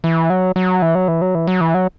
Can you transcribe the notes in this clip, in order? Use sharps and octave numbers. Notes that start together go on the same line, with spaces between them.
E3
F#3
F#3
E3
F#3
E3
F#3
E3
F#3
E3
F#3